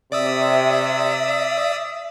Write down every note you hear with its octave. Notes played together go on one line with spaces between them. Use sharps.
C3 D5 E5 D#6 E6